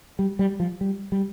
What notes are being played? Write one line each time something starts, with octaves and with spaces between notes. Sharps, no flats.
G3
G3
F3
G3
G3